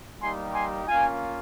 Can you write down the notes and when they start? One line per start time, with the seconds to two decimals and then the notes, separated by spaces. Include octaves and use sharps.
0.20 G3 A#3 D#4 G4 G#5 C6
0.54 G#5 C6
0.86 A#3 C#4 F4 F5 G#5